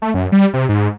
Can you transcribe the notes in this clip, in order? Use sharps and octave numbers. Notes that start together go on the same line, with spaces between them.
A3
F#2
G3
C3
G#2